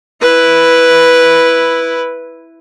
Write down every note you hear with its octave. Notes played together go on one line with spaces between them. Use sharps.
E4 B4